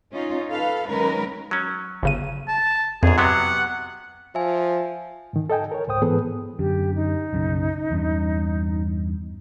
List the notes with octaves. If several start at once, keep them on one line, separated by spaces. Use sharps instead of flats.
C#4 D#4 F4
A4 B4 F5
D#3 F#3 G#3 C#4 A#4 B4
F#3 C#4
G1 C#3 D#7
A5
A#1 F2 G#2 G#4
C3 F#3 B3 F#5
F3 E5 G#5
G#2 D#3
A4 D#5 G5 G#5
A#4 C#5
C#2 G#2 C5 G5 D#6
G#2 E3 B3 G#4 A4 B4
F#2 D3 G4
D#4
B1 F#2 C#3
E2 G2 C#4